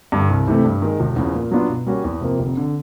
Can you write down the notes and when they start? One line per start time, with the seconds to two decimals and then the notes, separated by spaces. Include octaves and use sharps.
0.12 G2 D3
0.29 C2
0.47 C3 E3 A3
0.65 G2
0.82 D#3 G#3
1.00 E1
1.16 E2 C#3 F3
1.34 A#2
1.51 F#3 B3 D4 F4
1.69 B2
1.86 G3 A#3 C#4 F#4
2.04 E2
2.21 C3 F3 A#3
2.39 F1
2.57 D3